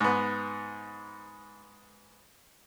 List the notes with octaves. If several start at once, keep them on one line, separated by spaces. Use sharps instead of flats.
G#2 B3